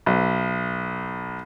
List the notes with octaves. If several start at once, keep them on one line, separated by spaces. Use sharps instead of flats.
B1